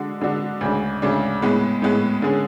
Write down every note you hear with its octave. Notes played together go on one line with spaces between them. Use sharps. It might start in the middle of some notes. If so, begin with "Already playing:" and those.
Already playing: D3 G#3 D4 F#4
D3 G#3 D4 F#4
D2 C#3 G#3 D4
D2 C#3 G#3 D4
A2 G#3 B3
A2 G#3 B3
D3 G#3 C#4 G#4